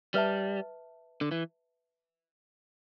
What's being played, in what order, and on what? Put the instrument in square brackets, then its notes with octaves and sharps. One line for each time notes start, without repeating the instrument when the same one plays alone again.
[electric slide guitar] G3 [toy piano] B4 E5 A5
[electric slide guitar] D3
E3